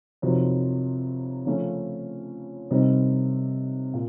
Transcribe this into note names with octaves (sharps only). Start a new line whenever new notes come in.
F2 C3 D#3 F#3
C#3 F3 A3 C#4
C3 D#3 G3 C4 D#4
A#2